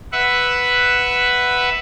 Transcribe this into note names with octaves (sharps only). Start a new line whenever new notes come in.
B4 E5 F#5